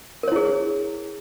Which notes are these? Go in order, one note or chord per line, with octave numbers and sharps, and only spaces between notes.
E4 G#4 A#4 C#5